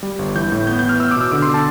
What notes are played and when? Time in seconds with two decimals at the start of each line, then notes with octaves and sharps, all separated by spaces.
0.03 G3
0.19 G1
0.35 E3 G6
0.52 A2
0.67 B3 G6
0.79 G6
0.83 E3
0.89 F6
1.00 B3 E6
1.11 D6
1.16 B2 E6
1.32 D3 D6
1.42 C6
1.48 D3
1.54 A5